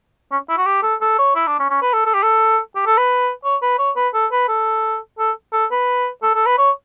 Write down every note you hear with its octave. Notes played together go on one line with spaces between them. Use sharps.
C#4
E4
F#4
G4
A4
A4
C#5
E4
D4
C#4
C#4
B4
A4
A4
G4
A4
G4
A4
B4
C#5
B4
C#5
B4
A4
B4
A4
A4
A4
B4
A4
A4
B4
C#5